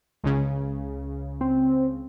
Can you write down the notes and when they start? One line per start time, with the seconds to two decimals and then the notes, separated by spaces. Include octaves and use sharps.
0.24 C#2 C#3
1.41 C4